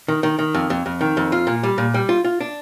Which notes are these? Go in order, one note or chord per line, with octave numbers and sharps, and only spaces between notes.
D#3
D#3
D#3
F2
F2
F2
D#3
F2
F4
A#2
G3
A#2
G3
F4
F4
D4